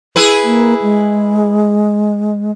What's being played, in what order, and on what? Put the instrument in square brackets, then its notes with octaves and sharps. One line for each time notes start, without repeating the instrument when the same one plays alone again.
[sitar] E4 G#4 B4
[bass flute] A#3
G#3